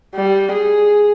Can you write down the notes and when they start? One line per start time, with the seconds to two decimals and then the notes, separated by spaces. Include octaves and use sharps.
0.15 G3
0.53 G#4